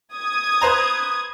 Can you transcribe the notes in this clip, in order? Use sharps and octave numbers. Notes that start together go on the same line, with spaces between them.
D#6 G#6
B4 C5 A#5